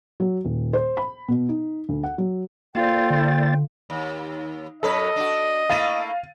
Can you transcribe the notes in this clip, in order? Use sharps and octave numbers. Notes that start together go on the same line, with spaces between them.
F#3
D#1
C5
B5
B2
D#4
D2
F#5
F#3
A#3 F4 A4 C5 D5 G5 A6
D3
D#2
F#2 A4 B4 C#5 D#5
D4 F#4
A3 A#3 E4 F5 A6 D#7